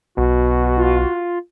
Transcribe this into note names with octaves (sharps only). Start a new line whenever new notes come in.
B1 B2 F#4
F4